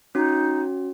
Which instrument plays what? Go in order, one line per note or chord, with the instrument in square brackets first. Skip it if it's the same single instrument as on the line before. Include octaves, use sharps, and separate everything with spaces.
[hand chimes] C#4 F#4 [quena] D#4